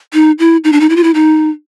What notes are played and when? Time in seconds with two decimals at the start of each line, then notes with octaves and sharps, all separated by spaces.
0.14 D#4
0.39 E4
0.64 D#4
0.73 D4
0.80 D#4
0.90 E4
0.96 F4
1.04 E4
1.15 D#4